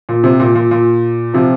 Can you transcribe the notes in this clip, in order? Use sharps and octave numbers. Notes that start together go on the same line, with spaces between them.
A#2
C3
A#2
A#2
A#2
C3 F3